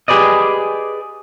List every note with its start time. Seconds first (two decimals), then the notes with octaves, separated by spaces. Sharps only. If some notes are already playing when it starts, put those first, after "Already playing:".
0.08 G4 G#4 B4 D5 D#5